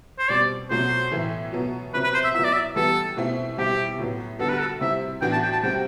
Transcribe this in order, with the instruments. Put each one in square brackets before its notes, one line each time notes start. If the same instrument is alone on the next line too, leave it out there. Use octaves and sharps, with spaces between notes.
[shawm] C5
[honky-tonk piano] B2 G3 C4 [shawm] D5
[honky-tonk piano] B2 F#3 A3 C4 F#4 [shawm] C5
[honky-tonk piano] A2 E3 A3 E4
B2 F#3 B3
[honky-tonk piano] C3 F#3 C4 [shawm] B4
[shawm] B4
C5
E5
[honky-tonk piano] F#3 B3 E4 [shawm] E5
[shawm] D5
E5
[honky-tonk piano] E3 G3 B3 [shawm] A4
[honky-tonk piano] B2 A3 C4 E4
[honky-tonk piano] B2 G3 C4 E4 [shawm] G4
[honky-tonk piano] A2 F#3 B3
[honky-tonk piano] D3 G3 B3 F#4 [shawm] A4
[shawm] B4
A4
[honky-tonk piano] C3 G3 C4 E4 [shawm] E5
[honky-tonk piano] A2 E3 B3 D4 F#4 [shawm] G5
[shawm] A5
G5
A5
[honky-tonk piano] C3 G3 C4 F#4 [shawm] G5